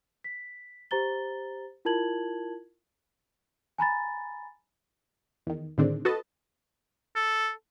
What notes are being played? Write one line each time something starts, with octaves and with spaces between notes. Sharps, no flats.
B6
G4 C5 A#5 A6 G7
E4 F4 A#4 A5 G#6 F#7
G#5 A#5 B5 A6
E2 D#3
A2 D3 D#3 G#3 C4 D4
F#4 A4 B4 D#5 A5
A4